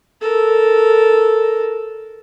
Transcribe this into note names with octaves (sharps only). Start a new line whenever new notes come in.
A4 A#4